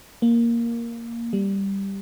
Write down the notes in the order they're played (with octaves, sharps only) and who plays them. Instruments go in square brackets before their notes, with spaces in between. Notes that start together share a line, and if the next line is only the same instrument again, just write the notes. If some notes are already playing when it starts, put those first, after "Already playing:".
[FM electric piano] A#3
G3